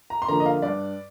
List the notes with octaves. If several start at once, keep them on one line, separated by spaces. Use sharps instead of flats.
A#5
C6
D3 F3 A#3 D4 A#5
D#5
F5
G2 D5